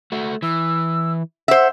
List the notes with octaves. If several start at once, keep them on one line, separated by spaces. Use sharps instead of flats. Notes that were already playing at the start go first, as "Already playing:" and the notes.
A3 F#4
E3 E6
C5 E5 F#5